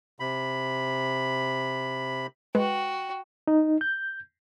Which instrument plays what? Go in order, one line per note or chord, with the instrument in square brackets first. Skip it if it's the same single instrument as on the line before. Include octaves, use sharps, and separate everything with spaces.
[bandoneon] C3 B5
[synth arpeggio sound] G#3 [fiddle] F#4 G5 [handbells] B4
[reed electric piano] D#4
G6